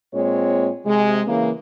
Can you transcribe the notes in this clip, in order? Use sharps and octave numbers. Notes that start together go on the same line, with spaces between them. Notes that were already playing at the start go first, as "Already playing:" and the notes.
A#2 G#3 C4 C#5
C3 G#3
C#3 E3 A#3